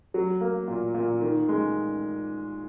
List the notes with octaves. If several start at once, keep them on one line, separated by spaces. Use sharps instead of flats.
F#3
A#3
A#2
A#2
D#3
G#3